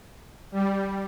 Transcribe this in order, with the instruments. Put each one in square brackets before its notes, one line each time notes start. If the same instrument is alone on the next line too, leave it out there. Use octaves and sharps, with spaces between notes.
[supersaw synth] G3